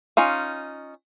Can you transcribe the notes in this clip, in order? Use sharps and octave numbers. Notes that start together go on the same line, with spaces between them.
C#4 D#4 F4